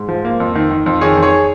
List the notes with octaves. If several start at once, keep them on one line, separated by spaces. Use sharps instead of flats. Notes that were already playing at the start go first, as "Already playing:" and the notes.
Already playing: G#2
F3
A#3
F2
D#3
D#3
F2
D#3 G#4 C#5
F2
G#4 C#5